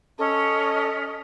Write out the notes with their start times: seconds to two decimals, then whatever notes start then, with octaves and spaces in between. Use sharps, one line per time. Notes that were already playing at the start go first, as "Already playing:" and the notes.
0.19 C#4 A4 D#5